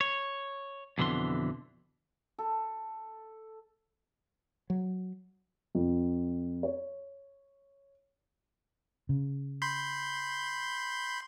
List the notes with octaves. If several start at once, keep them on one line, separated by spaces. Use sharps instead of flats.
C#5
F2 B2 D3 E3 C6
A4
F#3
F2
C#5
C#3
B5 C6 G6